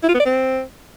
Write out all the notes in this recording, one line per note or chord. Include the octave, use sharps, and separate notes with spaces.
E4
F4
B3
D5
C4